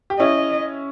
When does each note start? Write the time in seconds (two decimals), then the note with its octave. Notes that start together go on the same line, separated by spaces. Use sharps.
0.10 G4
0.19 C#4 E4 D#5